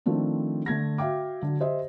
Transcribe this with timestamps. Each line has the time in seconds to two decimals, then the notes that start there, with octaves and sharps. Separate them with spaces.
0.06 D#3 F3 A3 C4 D4
0.66 D3 A3 G#6 A#6
0.98 F#4 E5 F5 G5 D6
1.42 D3 F#3
1.60 G4 C5 D#5 E5